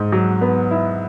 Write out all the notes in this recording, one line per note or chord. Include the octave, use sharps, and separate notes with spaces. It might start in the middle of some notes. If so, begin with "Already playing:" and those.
Already playing: G#2
F#3
B3
E4